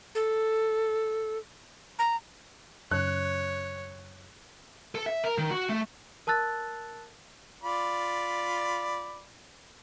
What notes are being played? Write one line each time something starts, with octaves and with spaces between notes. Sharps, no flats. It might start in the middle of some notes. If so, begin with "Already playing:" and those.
A4
A#5
F#2 C#3 C#5 F#6
A4
E5
A#4
D#3
F#4
A3
A#4 A5 E6 F#6 A6
F4 D5 B5